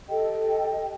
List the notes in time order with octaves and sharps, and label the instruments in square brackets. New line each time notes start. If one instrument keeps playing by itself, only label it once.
[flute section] G4 A4 D#5 G5